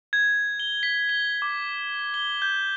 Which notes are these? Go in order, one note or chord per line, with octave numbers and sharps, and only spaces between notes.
G#6
G7
B6
G7
D6
G7
G6